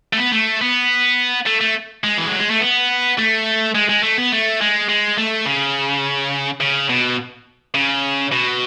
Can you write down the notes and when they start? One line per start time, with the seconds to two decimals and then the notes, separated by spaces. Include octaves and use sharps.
0.13 A3
0.17 B3
0.32 A3
0.61 B3
1.46 A3
1.61 A3
2.04 G#3
2.18 E3
2.28 F#3
2.39 G#3
2.50 A3
2.60 B3
3.18 A3
3.75 G#3
3.89 G#3
4.03 A3
4.18 B3
4.32 A3
4.61 G#3
4.89 G#3
5.18 A3
5.46 C#3
6.61 C#3
6.89 B2
7.74 C#3
8.32 B2